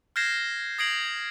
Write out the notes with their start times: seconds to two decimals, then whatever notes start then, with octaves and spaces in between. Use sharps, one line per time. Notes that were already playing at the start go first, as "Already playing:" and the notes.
0.16 F6 G6 G#6 A#6 C7 E7
0.79 D#6 G#6 A#6 C7 D7 F#7